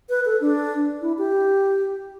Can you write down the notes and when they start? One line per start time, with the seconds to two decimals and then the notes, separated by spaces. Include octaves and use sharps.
0.09 B4
0.25 A4
0.41 D4
1.02 E4
1.18 G4